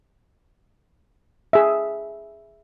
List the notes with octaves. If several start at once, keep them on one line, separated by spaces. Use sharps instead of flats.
G#4 E5